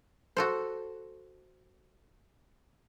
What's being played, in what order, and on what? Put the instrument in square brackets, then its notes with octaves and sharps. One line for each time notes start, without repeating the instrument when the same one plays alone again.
[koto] F#4 A4 C5